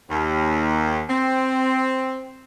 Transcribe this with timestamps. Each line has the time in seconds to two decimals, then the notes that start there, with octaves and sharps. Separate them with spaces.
0.10 D#2
1.10 C4